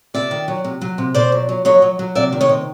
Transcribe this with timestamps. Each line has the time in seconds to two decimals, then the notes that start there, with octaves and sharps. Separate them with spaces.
0.14 C3 D5 E5
0.31 D#3
0.48 F#3
0.64 C3
0.81 F#3
0.98 C3
1.14 B2 C5 D5
1.32 F#3
1.49 F#3
1.65 F#3 C#5 D#5
1.82 F#3
1.99 F#3
2.15 C3 D5 E5
2.33 D#3
2.41 C#5 D#5
2.49 C3